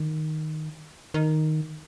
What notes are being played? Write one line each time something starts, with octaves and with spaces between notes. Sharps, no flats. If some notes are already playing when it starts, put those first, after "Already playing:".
Already playing: D#3
D#3